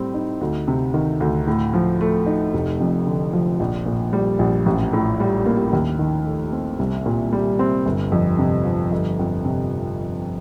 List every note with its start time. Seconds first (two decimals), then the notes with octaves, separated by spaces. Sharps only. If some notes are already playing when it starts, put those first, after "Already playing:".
Already playing: A2 G3 C4
0.14 D#4
0.41 D2
0.68 C3
0.94 D#3
1.20 D2
1.47 A2
1.74 F3
2.01 A3
2.26 D#4
2.54 F1
2.80 F2
3.07 D3
3.33 F3
3.60 A#1
3.86 A#2
4.13 G3
4.39 A#1
4.66 A1
4.93 A2
5.20 G3
5.46 A#3
5.73 D#2
5.99 D#3
6.26 A3
6.52 C4
6.79 C2
7.06 A#2
7.33 G3
7.59 C4
7.86 G1
8.12 F2
8.39 C3
8.65 F3
8.92 G1
9.19 F2
9.45 C3